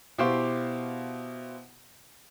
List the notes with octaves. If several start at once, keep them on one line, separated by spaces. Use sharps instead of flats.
B2 E4 G4 C5 F5 C#6